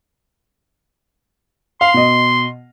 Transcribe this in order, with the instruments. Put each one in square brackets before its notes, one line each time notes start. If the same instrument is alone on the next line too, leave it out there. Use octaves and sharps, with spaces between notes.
[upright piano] F5 [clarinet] C6
[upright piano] B2 D#5